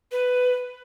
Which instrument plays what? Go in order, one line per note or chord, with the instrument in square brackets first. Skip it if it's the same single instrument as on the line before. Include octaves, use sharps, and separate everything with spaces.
[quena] B4